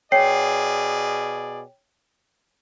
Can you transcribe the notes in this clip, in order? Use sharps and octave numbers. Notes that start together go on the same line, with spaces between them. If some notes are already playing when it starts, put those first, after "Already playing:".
B2 G#4 C#5 D5 G5 C7